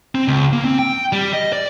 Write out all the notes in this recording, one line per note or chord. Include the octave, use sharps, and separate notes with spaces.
C4
C#2
A#3
C4
G5
G3
D#5
D5